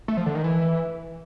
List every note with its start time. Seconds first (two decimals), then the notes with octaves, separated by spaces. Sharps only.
0.08 A3
0.17 F3
0.26 D3
0.35 D#3
0.44 E3